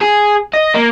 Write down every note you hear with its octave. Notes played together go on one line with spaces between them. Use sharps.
G#4
D#5
A#3